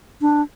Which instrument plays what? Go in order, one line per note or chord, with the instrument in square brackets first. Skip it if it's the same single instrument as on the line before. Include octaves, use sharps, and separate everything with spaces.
[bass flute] D4